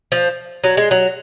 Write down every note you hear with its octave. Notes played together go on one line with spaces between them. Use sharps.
F3
F#3
G#3
F#3